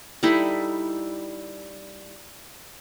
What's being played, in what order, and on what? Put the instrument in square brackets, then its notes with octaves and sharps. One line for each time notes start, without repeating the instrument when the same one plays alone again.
[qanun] G3 D#4 E4 A4